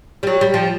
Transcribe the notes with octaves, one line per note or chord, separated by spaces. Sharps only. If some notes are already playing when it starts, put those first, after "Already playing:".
G3
F#3
G3
F3